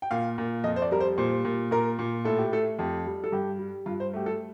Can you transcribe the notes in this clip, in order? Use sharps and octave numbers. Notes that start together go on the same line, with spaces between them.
G5
A#2 F5
A#2
F2 D#5
C5
D5
G3 A#4
C5
A#2 C5
A#2
A#2 A#4
A#2
A2 A4
G4
A3 A4
F2 G4
G3
A4
G2 G4
G3
G2 F4
C5
A3 G4
A4